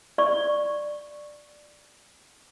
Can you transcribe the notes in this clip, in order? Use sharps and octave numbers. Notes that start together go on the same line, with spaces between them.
D5 C#6